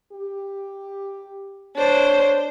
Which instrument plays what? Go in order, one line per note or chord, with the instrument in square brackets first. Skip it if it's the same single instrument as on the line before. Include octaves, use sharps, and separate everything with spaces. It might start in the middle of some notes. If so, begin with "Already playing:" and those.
[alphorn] G4
[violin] D4 C5 [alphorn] C#5